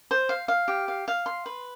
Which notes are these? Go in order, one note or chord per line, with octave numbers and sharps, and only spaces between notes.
C5
F5
F5
G4
F5
F5
C6
B4